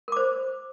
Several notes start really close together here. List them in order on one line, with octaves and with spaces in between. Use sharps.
A#4 D6 C5